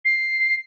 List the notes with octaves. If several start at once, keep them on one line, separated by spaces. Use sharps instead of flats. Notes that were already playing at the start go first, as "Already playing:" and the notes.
C7